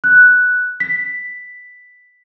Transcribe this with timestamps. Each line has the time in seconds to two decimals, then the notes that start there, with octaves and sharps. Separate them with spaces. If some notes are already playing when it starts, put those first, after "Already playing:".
0.04 F#6
0.80 B6